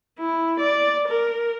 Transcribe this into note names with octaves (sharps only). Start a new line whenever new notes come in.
E4
D5
A#4